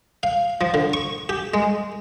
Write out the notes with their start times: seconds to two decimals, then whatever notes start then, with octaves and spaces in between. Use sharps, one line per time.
0.23 F5
0.61 F3
0.74 D3
0.93 C#6
1.29 G4
1.54 G#3